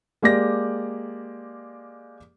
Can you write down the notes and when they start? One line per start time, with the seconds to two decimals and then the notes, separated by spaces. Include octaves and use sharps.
0.22 G#3 A#3 G4 D5 A#6